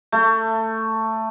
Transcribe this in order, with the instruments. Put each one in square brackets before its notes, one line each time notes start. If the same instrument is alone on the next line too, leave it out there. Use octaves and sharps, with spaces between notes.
[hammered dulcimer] A3